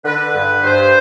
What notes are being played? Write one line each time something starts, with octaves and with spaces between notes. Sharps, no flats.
D3 B4
G2
G2 C5